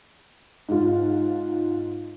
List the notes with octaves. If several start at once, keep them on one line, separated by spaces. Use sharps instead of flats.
G#2 F4